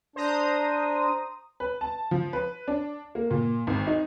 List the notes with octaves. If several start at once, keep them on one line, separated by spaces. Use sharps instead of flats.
D4 C5 A#5 D#6
B4
A5
F3
B4
D4
A#3
A#2
G#1
D#4